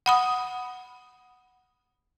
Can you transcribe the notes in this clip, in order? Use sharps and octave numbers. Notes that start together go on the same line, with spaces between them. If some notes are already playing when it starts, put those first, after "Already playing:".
F#5 B5 D#6